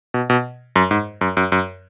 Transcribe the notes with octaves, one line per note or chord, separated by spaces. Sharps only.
B2
B2
F#2
G#2
F#2
F#2
F#2